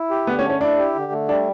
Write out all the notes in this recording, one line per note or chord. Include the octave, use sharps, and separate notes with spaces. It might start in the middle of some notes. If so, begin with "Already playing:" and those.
Already playing: E4
G4
D3 B3
C#4
A3
C#4
D4 E4
G4
D3
A3
G3 D4